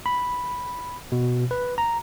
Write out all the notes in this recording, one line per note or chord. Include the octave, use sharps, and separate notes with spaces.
B5
B2
B4
A#5